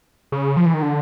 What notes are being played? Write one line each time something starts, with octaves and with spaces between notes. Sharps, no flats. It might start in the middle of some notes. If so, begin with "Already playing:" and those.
C#3
F3
E3
D#3
D3